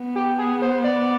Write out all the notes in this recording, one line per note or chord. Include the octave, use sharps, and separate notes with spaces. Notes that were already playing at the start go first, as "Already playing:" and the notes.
Already playing: B3
G4
G#4
C5
D5